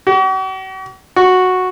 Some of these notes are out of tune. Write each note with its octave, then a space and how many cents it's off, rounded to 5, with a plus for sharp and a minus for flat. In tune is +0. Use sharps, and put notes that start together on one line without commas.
F#4 +45
F#4 -5